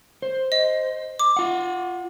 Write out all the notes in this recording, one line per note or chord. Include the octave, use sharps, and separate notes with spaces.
C5
D#5
D6
F4 F#5